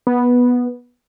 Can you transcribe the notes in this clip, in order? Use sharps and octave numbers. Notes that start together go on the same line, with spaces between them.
B3